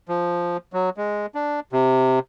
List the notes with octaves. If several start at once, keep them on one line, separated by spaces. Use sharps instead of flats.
F3
F#3
G#3
D4
C3